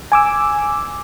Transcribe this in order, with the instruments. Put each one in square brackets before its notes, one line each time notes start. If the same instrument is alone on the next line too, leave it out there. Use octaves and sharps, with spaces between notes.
[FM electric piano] G#5 D6 E6